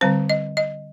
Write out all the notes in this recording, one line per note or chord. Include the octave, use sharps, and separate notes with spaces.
D3 G3 C4 C5
D#5
D#5